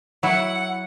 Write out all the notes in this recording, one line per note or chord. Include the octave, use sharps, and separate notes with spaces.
F#3 E4 F#5